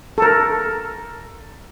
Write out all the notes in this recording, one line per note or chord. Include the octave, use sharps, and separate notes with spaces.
A4 A#4